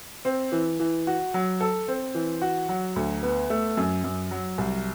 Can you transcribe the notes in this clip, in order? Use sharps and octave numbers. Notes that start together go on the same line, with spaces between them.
C4
E3
E3
F#4
F#3
A4
C4
E3
F#4
F#3
D2
B3
A3
F#2
F#2
F#3
C2